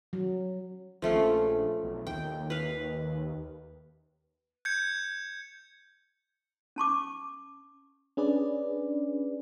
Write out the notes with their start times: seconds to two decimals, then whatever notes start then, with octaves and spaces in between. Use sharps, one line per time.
0.13 F#3
1.02 A#1 F3 A3 C#4
1.83 B1
2.07 D#2 G5
2.50 B4 F5
4.65 G6 G#6 C#7
6.76 C#4 A5 C#6 D6
8.17 C#4 D4 G#4 B4 D5